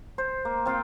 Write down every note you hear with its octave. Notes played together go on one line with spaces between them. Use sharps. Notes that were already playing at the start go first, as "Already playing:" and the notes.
C5
A#3
C4 F4 F5 G5